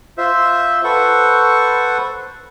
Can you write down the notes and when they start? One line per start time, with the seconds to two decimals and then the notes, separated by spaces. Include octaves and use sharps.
0.18 F4 C5 E5
0.84 A4 B4 C5 F#5 C#6